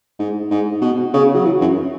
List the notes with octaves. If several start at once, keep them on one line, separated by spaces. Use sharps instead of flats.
G#2
G#2
B2
C#3
F#3
E3
F#2